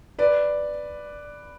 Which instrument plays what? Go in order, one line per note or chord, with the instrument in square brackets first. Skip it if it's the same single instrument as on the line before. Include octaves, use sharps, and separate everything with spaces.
[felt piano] B4 D5